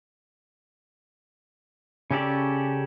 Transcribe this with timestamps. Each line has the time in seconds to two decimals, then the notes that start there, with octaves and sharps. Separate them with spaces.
2.11 C#3 C#4 G4 A4 D5